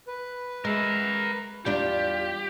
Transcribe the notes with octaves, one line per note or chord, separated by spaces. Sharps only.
B4
G#3 A#4 E5
E2 G3 D4 F4 G4